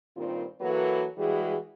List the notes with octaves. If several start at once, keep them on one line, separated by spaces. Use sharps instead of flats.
G2 A#2 D#3 G3 C4 F4
E3 F#3 A#3 F#4 A4 B4
E3 G3 G#3 F#4 G#4